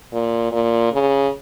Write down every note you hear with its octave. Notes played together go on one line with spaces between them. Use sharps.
A#2
A#2
C#3